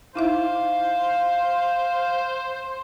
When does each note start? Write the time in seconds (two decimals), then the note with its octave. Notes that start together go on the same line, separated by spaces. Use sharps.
0.16 D#4 E4 C5 E5 F5